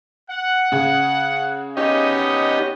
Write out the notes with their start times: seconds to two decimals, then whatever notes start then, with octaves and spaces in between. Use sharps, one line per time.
0.31 F#5
0.72 C#3 G#4
1.77 B3 C#4 D#4 G4 D#5